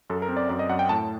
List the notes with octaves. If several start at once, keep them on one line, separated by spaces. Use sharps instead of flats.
F#2 A4
A#4
C4
D5
F#2 D5
D#5
F#2 F#5
G5
A2 A5